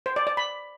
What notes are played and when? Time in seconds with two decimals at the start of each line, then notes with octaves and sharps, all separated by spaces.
0.06 C5
0.16 D5
0.27 D5
0.37 B5